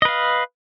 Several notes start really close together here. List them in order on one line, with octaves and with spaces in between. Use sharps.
D#5 B4 F5